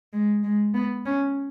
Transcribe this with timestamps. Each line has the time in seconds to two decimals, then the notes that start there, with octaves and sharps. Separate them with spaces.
0.13 G#3
0.44 G#3
0.74 B3
1.06 C#4